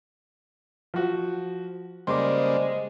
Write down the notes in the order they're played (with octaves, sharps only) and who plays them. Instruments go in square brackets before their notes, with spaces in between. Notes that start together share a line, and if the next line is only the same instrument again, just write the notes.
[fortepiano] F3 F#4
[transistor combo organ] C#3 G3 A#3 [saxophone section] G#3 [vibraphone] C5 D5 [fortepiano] C6 D6